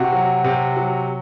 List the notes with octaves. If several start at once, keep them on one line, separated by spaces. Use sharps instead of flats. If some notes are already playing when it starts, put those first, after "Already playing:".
Already playing: C3 F#4
F#3
C3
F#3